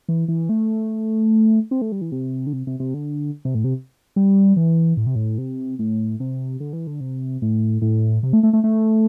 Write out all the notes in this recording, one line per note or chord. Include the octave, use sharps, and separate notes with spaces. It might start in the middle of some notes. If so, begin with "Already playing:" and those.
E3
E3
A3
C4
A3
G3
E3
C3
D3
C3
C3
C3
D3
C3
A2
C3
G3
E3
A2
C3
A2
C3
A2
C3
D3
E3
D3
C3
A2
A2
C3
A3
A3
A3
A3